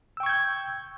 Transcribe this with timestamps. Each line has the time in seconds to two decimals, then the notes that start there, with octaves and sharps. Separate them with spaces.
0.17 E6
0.20 G5
0.23 C#6
0.26 G#6
0.29 G6